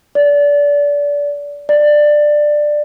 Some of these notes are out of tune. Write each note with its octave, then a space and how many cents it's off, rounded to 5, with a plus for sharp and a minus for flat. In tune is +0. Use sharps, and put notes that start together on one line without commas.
D5 -25
D5 +15